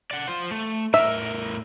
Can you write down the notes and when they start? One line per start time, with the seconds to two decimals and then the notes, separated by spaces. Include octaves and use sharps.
0.11 D5 F#5
0.28 F4 C5
0.51 A3
0.94 A2 A#4 E5